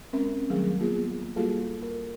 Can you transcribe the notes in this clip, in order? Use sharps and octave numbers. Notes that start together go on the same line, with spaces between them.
G#3 C4 C#4 A#4 E5
D#3 F#3 G3 A3 G#4 A#4
A#3 B3 F4 G#4
G3 A#3 F4 F#4 G#4 A4
A#4